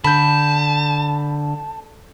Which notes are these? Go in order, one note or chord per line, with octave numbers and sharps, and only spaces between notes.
D3 A5 B5 G6